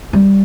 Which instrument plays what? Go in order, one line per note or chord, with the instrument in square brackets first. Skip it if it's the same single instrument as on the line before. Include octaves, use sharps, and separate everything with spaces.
[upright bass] G3